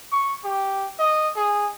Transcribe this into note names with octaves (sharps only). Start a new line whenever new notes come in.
C#6
G4
D#5
G#4